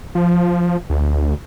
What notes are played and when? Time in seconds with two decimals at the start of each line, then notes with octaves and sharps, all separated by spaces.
0.15 F3
0.90 D2